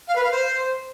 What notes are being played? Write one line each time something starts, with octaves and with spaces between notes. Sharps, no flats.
F5
B4
F5
C5